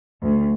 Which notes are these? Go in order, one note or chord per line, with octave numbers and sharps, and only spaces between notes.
D2